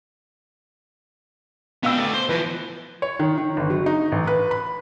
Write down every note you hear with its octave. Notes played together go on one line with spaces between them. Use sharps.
B2 B3 F5 G5 E6
A3 D5
C5
E3 F3 B4
C#5
D#3
D#3
G1
F#3
D#4
A1
B4
B5